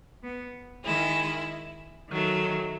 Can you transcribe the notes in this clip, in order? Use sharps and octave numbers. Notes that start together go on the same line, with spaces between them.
B3
D#3 G#3 E4
D#3 F#3 A3